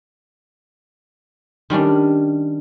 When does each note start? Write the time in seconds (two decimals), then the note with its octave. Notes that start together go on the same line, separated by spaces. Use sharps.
1.70 D#3 G3 C#4 D4